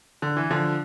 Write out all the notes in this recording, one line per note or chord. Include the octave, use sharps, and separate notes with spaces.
D3
E3
D3 F3